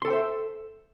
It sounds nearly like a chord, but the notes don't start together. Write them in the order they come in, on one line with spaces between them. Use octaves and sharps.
C6 A4 G5 C5 E5